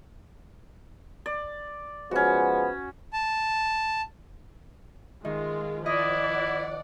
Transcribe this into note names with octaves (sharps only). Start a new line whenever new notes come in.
D5
F3 G#3 B3 C#4 F#4
A5
D#3 G#3 F4
F3 E4 D5 D#5 F#5